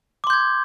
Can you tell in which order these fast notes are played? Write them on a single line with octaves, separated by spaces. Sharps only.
D6 C6 G6 G#6